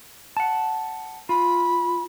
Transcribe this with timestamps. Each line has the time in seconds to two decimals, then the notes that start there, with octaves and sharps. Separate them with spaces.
0.37 F#5 A5
1.29 F4 B5